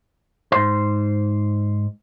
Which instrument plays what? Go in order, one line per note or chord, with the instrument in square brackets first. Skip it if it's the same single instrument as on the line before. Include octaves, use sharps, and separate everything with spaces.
[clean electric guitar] G#2 C5